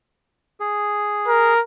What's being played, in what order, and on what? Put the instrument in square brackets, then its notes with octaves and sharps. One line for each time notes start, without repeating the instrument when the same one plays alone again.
[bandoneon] G#4
[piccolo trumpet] A#4